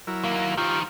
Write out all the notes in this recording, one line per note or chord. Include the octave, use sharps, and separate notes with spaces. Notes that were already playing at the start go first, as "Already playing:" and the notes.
F#3 E4 A#4
D#2 A#3
D#3 F3 F4 G4